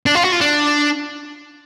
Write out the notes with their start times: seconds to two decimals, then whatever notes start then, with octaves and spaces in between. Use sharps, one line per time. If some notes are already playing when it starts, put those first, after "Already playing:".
0.06 D4
0.15 F4
0.23 F#4
0.32 F4
0.41 D4